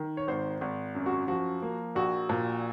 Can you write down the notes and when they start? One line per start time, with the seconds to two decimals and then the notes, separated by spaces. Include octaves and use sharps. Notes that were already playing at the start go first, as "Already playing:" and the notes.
Already playing: D#3
0.17 C#5
0.28 G#1 C5
0.61 G#1
0.95 F#2
1.06 F#4
1.28 F3 F#4
1.62 A#3
1.95 A#1 F#4
2.29 A#2